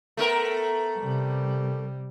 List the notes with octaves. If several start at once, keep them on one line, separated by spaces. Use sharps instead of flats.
A3 B3 A#4
C3 G3